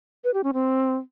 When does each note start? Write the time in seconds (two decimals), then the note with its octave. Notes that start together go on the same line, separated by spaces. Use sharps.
0.24 B4
0.34 G4
0.44 C#4
0.54 C4